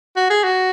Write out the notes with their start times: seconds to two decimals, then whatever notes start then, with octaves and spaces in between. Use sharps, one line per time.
0.16 F#4
0.30 G#4
0.44 F#4